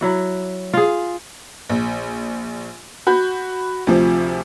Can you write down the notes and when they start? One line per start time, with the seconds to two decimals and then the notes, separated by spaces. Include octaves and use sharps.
0.01 F#3 E4 F#4
0.73 F4 G#4
1.70 A#1
3.07 F#4 B5 G6
3.87 D2 C3 F3